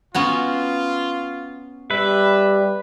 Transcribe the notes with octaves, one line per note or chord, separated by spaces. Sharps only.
B3 C#4 F4 F#4
G3 B4 E5